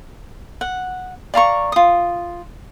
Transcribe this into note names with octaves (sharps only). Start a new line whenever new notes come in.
F#5
D5 F5 A#5 C#6
F4 D#6